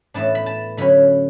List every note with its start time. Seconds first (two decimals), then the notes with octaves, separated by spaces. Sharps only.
0.14 A2 E3 B3 D4 A5
0.35 B5
0.46 A5
0.77 D3 F#3 C#4 B5